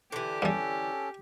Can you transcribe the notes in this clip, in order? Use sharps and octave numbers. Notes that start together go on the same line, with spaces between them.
D3 E3 G4 D6
G2 G3 C#4 A4